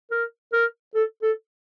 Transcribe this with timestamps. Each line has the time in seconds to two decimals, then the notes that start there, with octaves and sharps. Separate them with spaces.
0.11 A#4
0.53 A#4
0.95 A4
1.22 A4